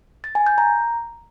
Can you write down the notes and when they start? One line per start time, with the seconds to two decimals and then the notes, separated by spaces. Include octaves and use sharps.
0.24 A6
0.35 G#5
0.47 G6
0.58 A#5